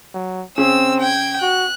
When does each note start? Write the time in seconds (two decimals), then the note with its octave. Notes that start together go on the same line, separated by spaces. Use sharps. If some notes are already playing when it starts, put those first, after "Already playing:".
0.14 F#3
0.58 C#3 C4 E6
1.00 G5 G#6
1.42 F#4 F#6